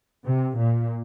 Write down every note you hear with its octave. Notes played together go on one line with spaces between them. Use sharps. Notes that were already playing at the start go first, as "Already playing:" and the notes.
C3
A#2